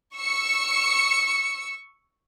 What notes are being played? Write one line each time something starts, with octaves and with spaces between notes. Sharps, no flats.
C#6 E6 C#7